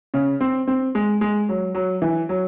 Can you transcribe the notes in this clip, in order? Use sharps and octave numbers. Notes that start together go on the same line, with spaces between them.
C#3
C4
C4
G#3
G#3
F#3
F#3
E3
F#3